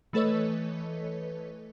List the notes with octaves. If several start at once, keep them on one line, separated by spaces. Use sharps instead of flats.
E3 A3 A4 B4 C#5 D#5